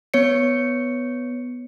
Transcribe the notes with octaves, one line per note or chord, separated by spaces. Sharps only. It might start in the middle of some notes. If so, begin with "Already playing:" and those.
B3 C#5 C#7